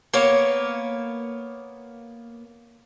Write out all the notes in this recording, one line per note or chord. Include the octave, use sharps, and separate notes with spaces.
A#3 B3 C#5